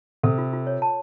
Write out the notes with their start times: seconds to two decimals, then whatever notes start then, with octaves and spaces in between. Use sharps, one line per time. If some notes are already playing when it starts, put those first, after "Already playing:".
0.23 C3 A4
0.38 F4
0.53 F4
0.67 C#5
0.82 A5